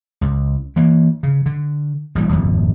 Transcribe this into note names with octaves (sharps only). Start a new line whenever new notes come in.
C#2
E3 A#3
C#3
D3
A1 B2 G3
D#1 G#1 F2 B2